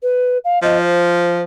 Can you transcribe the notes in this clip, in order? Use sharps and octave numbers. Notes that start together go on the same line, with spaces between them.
B4
F5
F3 D#5
C5